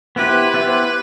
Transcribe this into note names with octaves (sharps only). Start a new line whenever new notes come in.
B3 E4 G4 B4 C5
B3 E4 G4 C5